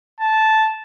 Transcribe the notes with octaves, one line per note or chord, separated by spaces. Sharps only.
A5